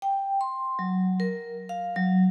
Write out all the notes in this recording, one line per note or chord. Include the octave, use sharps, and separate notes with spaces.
G5
C6
F#3
A#4
F5
F#3